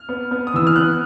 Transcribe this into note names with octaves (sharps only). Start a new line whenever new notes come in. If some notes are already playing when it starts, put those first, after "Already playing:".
Already playing: F6
B3
B3
D#6
E3 E6
F6
B3 F#6